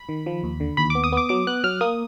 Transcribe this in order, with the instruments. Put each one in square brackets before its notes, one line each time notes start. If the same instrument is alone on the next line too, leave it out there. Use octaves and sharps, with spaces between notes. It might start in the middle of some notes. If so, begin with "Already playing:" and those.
Already playing: [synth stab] B5
[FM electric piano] D#3
F3
D#2
D3
[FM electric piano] D#2 [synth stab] B5
[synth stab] D6
[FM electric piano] B3
[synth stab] D#6
[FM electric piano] B3 [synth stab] D6
[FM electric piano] F#3 [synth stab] D6
[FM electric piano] B3 [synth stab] F#6
[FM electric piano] F#3 [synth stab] F6
[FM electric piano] A#3 [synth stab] D#6